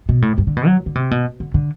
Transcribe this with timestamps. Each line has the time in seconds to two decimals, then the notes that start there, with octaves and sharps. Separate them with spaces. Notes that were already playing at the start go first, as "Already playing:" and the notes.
0.09 B2
0.22 A2
0.38 G2
0.47 D3
0.57 B2
0.67 F#3
0.86 D3
0.95 C3
1.11 B2
1.40 D3
1.54 D3